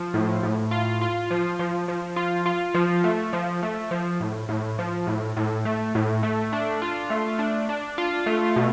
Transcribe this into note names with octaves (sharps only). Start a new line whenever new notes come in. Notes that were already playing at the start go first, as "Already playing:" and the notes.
Already playing: F3
A2
A2
F4
F4
F3
F3
F3
F4
F4
F3
A3
F3
A3
F3
A2
A2
F3
A2
A2
A3
A2
A3
D4
F4
A3
D4
D4
F4
A3
B2